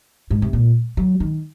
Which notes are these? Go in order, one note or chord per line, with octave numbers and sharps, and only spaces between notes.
G#2
C3
A#2
F#3
D#3